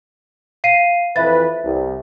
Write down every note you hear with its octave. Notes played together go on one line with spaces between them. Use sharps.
F5 C7 D#7
F2 E3 B4 E5 A6
C2